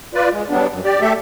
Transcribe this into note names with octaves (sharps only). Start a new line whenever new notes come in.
F4 B4 D5
G#3
F#3 G3 B3 D4
F#2
G4 D5
A3 G4 A4 E5